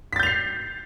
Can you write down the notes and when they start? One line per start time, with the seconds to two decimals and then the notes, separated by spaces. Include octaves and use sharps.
0.13 B6
0.16 A6
0.20 G6
0.23 F7
0.26 C7